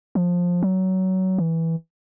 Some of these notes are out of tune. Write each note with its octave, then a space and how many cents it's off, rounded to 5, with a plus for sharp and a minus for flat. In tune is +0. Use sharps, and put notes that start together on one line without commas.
F3 +15
F#3 +20
E3 -10